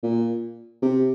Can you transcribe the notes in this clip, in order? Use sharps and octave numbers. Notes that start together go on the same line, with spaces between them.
A#2
C3